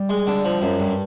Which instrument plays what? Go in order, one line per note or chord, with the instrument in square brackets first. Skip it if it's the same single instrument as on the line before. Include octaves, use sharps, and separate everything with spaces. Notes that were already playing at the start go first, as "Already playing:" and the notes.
Already playing: [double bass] G3
[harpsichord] G#3
D3
F3
F#2
G2